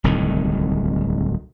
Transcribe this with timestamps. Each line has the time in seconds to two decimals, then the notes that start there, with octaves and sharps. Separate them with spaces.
0.04 D1 C2 A2 D#3